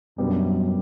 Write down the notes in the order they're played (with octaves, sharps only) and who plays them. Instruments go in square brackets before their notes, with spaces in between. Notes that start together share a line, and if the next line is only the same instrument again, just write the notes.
[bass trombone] F#2 [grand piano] B2 G3 B3 D4